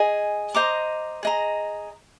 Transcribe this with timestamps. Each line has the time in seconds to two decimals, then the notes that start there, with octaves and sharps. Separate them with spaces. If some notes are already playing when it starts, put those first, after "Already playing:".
Already playing: G#4 D#5 G#5
0.54 C5 D#5 A#5 D6
1.23 G#4 D#5 A#5